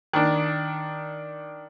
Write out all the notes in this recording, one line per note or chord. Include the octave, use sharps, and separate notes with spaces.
D#3 D4